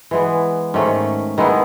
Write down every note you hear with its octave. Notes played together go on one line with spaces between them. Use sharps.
E3 G#3 B3
G#2 D#3 A3 C#4
D#3 G#3 B3 E4